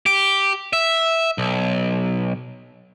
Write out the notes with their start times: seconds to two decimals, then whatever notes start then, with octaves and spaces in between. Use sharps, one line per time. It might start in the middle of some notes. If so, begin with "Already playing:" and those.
0.06 G4
0.73 E5
1.38 B1